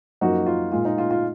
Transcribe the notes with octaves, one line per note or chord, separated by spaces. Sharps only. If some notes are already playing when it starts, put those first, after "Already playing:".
F#2 F3 A#3 D#4 F#4
F4
A#2 G#3 F4
D#4
F4
F4